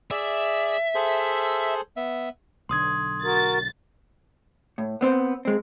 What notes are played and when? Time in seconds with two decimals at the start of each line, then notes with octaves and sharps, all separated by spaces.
0.11 G#4 D5 E5
0.95 G#4 A4 C5
1.97 B3 E5
2.69 B1 D3 C6 D#6 G#6
3.23 F#4 A#4 A6
4.78 A2
5.01 B3 C4 C5
5.45 G#3 C4